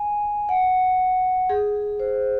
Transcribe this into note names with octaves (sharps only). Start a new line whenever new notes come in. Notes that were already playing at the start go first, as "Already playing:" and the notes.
Already playing: G#5
F#5
G#4
C5